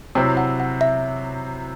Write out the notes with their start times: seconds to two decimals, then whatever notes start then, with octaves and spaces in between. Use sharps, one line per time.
0.15 C3 F#3 C4 E4 G5
0.37 F#5
0.60 F#5
0.81 E5